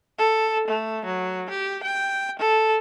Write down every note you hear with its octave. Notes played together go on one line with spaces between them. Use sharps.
A4
A3
F#3
G4
G5
A4